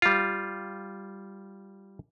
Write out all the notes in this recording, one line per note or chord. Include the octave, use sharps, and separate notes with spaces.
G3 F4